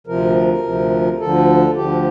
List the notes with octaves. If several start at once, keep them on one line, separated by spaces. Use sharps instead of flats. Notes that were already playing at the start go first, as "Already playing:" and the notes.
D2 C3 F3 A#4
D2 C3 F3
D2 D3 F3 A4
D2 D3 F3 G4